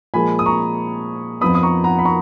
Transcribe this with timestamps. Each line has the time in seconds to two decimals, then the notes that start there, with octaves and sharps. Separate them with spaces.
0.14 A#2 F3 G#3 G#5 B5
0.39 D#6
0.46 A#5 C#6
1.41 F2 F3 B3 B5 D#6
1.55 D#6
1.63 A#5 C#6
1.84 F#5 A#5
1.99 B5
2.05 A#5 C#6